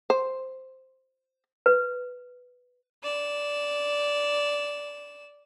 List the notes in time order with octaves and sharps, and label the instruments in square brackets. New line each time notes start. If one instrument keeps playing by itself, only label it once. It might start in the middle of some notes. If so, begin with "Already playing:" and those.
[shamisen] C5
[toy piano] B4
[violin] D5 E7